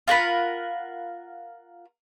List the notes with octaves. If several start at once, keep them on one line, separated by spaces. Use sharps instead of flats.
F4 A#4 F#5 B5